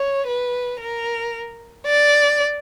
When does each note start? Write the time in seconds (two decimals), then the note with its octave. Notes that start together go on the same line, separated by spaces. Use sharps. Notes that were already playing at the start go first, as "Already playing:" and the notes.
Already playing: C#5
0.27 B4
0.80 A#4
1.86 D5